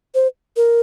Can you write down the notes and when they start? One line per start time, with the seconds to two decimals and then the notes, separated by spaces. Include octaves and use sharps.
0.15 C5
0.56 A#4